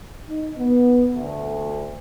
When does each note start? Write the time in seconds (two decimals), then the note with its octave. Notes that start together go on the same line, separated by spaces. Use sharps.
0.29 D#4
0.58 B3
1.15 D2